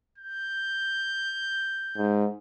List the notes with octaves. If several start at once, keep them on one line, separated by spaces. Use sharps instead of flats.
G6
G#2